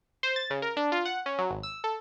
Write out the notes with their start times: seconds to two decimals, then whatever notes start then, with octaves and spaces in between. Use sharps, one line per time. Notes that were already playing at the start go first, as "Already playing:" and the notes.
0.23 C5
0.36 A6
0.50 C#3
0.62 A#4
0.77 D4
0.92 F4
1.05 F#5
1.26 C#4
1.39 F#3
1.51 G#1
1.63 E6
1.84 A4